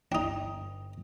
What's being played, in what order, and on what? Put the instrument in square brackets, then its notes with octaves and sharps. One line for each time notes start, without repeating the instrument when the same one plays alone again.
[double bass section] G1 [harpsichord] D4 D#4 [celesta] G5 D#6